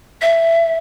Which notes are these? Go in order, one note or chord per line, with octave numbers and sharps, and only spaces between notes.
E5